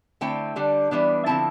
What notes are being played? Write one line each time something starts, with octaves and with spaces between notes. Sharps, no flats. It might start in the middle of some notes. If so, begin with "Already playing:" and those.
D3 A3 C4 E4 G5
D3 G3 D4
E3 G3 B3 D4
D3 F3 C4 E4 A5